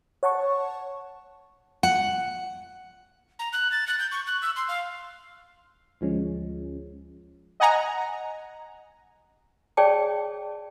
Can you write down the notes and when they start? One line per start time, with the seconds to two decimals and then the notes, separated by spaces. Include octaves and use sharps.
0.23 C#5 F#5 A5 C#6
1.83 F#5
3.39 A#5
3.53 F#6
3.72 A6
3.87 F#6
3.99 G6
4.12 C#6
4.27 F#6
4.42 E6
4.56 C6
4.68 F5
6.01 D2 F3 G#3 C#4
7.60 D#5 F#5 G#5 A#5
9.77 G#4 C#5 D5 G5 A5